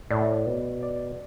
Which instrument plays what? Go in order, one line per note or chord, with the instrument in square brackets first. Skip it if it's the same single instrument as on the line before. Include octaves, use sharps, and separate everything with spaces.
[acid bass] A2 [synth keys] D5
[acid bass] B2
[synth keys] D5